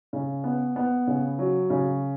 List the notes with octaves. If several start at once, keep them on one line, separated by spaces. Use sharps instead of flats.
C#3
B3
B3
C#3
F#3
C#3